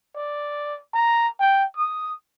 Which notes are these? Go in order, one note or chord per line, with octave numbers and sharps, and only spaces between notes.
D5
A#5
G5
D#6